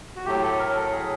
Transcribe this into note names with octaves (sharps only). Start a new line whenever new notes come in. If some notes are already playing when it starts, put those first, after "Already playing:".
F#4
A2 F#3 A3 G4
A4
A#4
A4
G#4